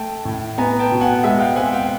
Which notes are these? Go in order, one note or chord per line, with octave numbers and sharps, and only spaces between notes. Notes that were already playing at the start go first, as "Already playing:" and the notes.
Already playing: A3 G5 A5
A2
B3 G#5 A#5
G5 A5
B2
F#5 G#5
G#3 E5 F#5
F5 G5
C4 F#5 G#5
F5 G5